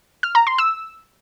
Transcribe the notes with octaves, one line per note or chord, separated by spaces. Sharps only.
F6
A#5
C6
E6